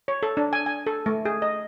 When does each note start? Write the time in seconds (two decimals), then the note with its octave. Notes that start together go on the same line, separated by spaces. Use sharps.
0.08 C#5
0.23 A4
0.37 D4
0.53 G#5
0.66 G#5
0.87 A4
1.06 A3
1.25 G#4
1.42 D#5